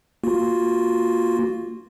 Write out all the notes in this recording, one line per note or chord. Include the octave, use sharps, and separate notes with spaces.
A#3 F4 F#4